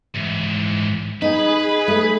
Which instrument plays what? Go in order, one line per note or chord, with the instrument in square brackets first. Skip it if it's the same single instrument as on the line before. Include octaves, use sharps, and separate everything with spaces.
[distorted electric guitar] G#2 E3
[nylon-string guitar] D#4 [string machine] G#4 B5 [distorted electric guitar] B4
[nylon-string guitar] A3